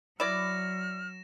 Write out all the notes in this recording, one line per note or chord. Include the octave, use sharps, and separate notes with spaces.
F#3 E4 D5 F6 A#6 E7